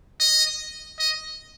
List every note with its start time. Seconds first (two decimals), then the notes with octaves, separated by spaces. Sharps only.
0.20 D#5
0.99 D#5